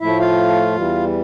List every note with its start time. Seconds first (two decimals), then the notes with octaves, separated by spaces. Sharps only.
0.01 A2 F3 A3 E4 E5
0.20 F4 F5
0.76 E2 E3 G3